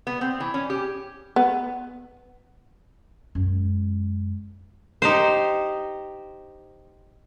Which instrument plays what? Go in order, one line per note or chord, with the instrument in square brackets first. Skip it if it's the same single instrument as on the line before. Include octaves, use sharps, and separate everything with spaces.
[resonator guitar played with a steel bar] B3
C4
E3
C#4
G4
[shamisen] B3
[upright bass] F#2 G#3
[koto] D#4 G4 C5